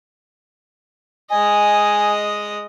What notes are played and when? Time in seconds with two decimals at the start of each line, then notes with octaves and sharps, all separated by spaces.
1.30 G#3 D#5 G#5